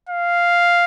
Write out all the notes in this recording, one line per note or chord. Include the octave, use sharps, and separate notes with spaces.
F5